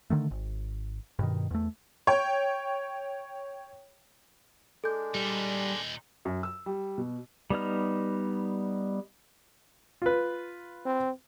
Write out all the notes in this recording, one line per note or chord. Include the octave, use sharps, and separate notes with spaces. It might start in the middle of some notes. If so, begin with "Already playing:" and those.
D3 D#3 A3
G#1
G2 B2 D#3
E2 A3
C#5 G5
G#3 D4 A4 G6
A#2 G3 D#4
F#2
E6
G3
B2
G3 B3 D#4 F6
F4 B4
C4